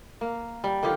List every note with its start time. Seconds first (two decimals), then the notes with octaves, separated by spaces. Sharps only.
0.21 A#3
0.64 G3
0.83 D3 D#3 F3 G4